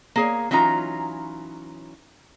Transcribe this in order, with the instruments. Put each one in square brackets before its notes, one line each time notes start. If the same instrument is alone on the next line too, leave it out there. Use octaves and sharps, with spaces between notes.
[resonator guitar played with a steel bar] A#3 G#4 C#5
E3 F#3 C#4 D#4 F4 A#5